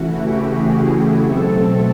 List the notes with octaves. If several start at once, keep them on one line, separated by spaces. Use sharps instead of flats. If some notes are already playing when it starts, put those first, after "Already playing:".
Already playing: C#3 E3 A3 C#4 E4 F#4
G4
G#4
B2 F#3 A3 C4 A4